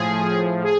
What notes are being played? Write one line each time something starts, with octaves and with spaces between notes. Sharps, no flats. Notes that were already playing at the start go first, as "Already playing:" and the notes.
Already playing: A2 F3 G#4
G#4